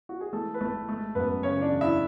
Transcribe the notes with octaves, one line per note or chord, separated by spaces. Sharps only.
F#4
G#4
E3 A3 A4
B4
G#1 A3 A4
G#3 A3 A4
F#2 B3 B4
C#3 C#4 C#5
D4 D5
E1
E4 E5